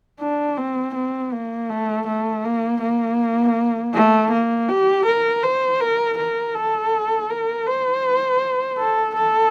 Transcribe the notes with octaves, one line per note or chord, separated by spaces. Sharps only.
D4
C4
C4
A#3
A3
A3
A#3
A#3
A3
A#3
G4
A#4
C5
A#4
A#4
A4
A#4
C5
A4
A4